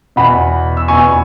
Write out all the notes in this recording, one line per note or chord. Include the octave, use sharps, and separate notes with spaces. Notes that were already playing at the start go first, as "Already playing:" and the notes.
E2 B2 F#5 B5
E6
E2 B2 G#5 C#6